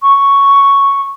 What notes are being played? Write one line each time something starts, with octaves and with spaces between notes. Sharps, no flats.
C#6